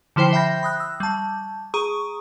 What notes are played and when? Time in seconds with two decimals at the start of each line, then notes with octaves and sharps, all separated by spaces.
0.16 D3 F3 E4 C5 G5 C7
0.33 E5 G5 B5 G6 A#6
0.63 B5 D#6 F#6
0.80 E6
1.00 G3 A5
1.74 G#4 A#5 C#6 D#6